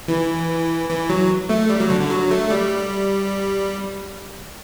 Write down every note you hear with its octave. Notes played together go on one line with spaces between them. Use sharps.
E3
E3
F#3
A3
G3
F#3
D3
D3
F#3
A3
G3